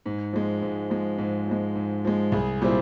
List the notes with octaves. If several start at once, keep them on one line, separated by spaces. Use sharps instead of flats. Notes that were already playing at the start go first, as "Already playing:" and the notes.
G#2
F3 G#3
G#2
F3 G#3
G#2
F3 G#3
G#2
F3 G#3
C2 G#4
A#2 G3 C4 E4